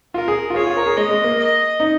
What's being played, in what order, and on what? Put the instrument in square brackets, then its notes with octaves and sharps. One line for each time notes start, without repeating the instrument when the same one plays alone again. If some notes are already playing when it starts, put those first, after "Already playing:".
[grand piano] F4 [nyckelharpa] A#4
[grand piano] G#4
F4
[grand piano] G#4 [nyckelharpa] C#5
[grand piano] F4
A#4
G#4
[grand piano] G#3 [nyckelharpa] D#5
[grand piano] G#3
A#3
[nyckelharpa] D#5
[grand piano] D#4